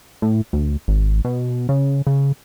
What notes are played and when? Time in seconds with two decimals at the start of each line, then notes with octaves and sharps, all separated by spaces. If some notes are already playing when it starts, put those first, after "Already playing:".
0.22 A2
0.53 D2
0.88 G#1
1.25 B2
1.69 C#3
2.07 C#3